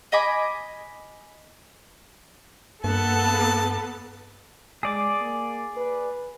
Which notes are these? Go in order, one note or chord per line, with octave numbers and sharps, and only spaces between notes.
D#5 G#5 B5 D6
G2 A#3 B3 A4 A5
G#3 G#4 D5 D6
A#3
B4